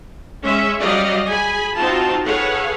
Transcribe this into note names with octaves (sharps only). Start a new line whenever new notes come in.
G#3 C#4 E5
F#3 G3 G4 D5 D#5 F5
G#4 G#5 B5
C4 D#4 F4 F#4 A5
G#4 A4 B4 C#5 F5 F#5